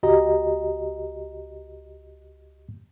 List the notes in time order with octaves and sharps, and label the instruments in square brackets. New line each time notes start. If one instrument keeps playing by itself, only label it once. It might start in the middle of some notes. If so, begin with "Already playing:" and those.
[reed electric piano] C#2 F#4 G4 D#5 A#5